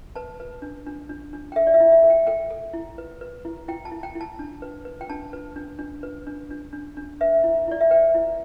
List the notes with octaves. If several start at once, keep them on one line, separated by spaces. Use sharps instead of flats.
B4 A5
B4
D4
D4
D4
D4
G5
A4 E5
D5
E5
E4
E5
A4
G5
A4 G5
A4
E4
B4
B4
E4
E4 G5
A5
E4
G5
E4
A5
D4
B4
B4
G5
D4 A5
B4
D4
D4
B4
D4
D4
D4
D4
B4 E5
E4
E4 D5
E5
B4 G5
E4